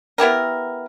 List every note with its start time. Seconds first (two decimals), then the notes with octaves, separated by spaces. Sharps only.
0.18 B3 E4 G4 A#4